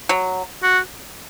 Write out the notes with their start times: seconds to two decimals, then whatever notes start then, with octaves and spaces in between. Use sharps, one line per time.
0.09 F#3
0.63 F#4